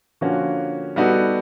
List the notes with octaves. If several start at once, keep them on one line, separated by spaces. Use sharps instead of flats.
D3 F3 A#3 C#4 F#4
G3 B3 D#4 F#4 A4